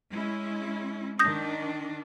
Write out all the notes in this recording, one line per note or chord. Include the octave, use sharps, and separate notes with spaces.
G#3 C#4 E4
D#3 D4 D#6 G6 A#6